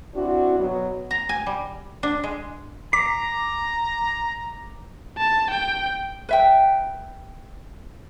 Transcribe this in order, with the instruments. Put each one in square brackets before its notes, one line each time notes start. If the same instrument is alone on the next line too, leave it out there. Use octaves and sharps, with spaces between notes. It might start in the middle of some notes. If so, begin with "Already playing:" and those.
[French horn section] C4 D4 E4 F#4
B2 F#3 B3
[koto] A#5
G#5
G3
D4
G#3
[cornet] A#5 [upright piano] D6 [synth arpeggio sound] B6
[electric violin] A5
G5
[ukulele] B4 E5 G5